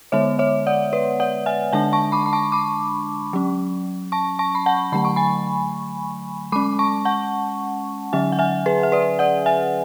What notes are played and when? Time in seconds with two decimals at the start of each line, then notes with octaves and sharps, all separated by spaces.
0.12 D3 G#3 B3 C#5 E5
0.39 C#5 E5
0.67 D5 F#5
0.93 B4 D5
1.20 D5 F#5
1.46 E5 G#5
1.73 D3 G#3 D4 F#5 A5
1.93 A5 C#6
2.12 B5 D6
2.26 B5
2.33 A5 C#6
2.52 B5 D6
3.33 F#3 C#4
4.12 A5 C#6
4.39 A5 C#6
4.55 B5
4.66 F#5 A5
4.92 D3 F#3 A3 B5
5.05 C#6
5.16 G#5 B5
6.52 G#3 B5 D6
6.56 C#4
6.79 A5 C#6
7.05 F#5 A5
8.13 D3 F#3 C#4 E5 G#5
8.32 F#5
8.39 E5 G#5
8.66 G#4 B4
8.83 E5
8.92 B4 D5
9.19 D5 F#5
9.46 E5 G#5